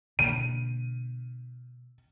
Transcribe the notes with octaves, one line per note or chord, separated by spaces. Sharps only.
B2 D3 A#3 D#7